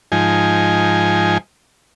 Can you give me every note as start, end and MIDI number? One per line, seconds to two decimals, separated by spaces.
0.12 1.38 44
0.12 1.38 53
0.12 1.38 63
0.12 1.38 80